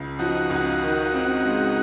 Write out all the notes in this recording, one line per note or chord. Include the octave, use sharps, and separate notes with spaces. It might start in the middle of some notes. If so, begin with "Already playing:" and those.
Already playing: C#2 C#3
F3 D#4 F#4
C#2
D#3
C4
G#3